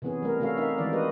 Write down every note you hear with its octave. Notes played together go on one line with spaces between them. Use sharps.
C3 E3 B3 C#4 G#4
G3 A3 A#4
C3 A3 C#4 F#4 A4 F5
D#4 A#4 E5 F5
D#3 E3 G#3 D5
F#4 G4 B4 D#5